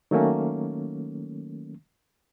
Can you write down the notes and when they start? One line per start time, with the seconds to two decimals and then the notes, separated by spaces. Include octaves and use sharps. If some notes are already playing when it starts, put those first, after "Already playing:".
0.11 D#3 F#3 A3 A#3 C#4